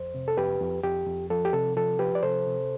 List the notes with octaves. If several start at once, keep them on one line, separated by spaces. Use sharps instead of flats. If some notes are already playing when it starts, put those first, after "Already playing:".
Already playing: F2 C5
C3
A4
F2 G4 B4
F2
F2 G4
F2
F3 A4
G4
C3 A4
F3 A4
F3 G4 B4
D5
C3 A4 C5
C3